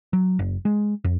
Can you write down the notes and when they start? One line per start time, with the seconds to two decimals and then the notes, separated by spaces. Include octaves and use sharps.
0.13 F#3
0.39 F#1
0.65 G#3
1.04 F2